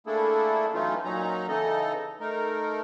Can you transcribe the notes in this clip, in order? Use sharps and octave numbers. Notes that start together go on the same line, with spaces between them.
A3 A#3 D4 E4 G#4 A4
E3 F#3 A3 C#4 D#4 F4
A#2 F#3 C#4 D#4 A#5
C#3 E3 D#4 A4 D#5
A3 D#4 A#4